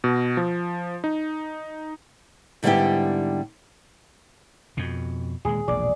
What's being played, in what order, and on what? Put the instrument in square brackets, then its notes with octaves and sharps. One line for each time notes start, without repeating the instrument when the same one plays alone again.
[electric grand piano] B2
F3
D#4
[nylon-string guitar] G#2 D3 G3 B3 E4 G4
[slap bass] F2 B2
[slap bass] D#1 G#3 [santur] G#4
[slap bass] E1 A#1 [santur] D5